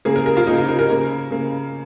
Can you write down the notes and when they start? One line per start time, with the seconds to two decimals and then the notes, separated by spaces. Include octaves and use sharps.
0.05 C#3 A#3 G#4
0.16 A#4
0.26 A#4
0.37 F4
0.47 C#3 A#3 D#4
0.58 F4
0.68 A#4
0.79 A#4
0.89 C#3 A#3
1.31 C#3 A#3